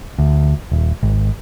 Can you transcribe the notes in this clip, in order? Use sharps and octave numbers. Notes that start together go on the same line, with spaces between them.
D2
D#1
G#1